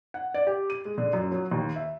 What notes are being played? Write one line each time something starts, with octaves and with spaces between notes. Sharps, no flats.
F#5
D5
G4
D#7
G#3
D3
F#2
F#3
D#2
E5